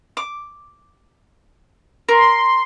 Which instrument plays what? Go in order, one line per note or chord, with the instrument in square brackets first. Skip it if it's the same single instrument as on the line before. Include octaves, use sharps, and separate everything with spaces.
[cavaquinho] D6
[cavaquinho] A#4 [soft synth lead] C6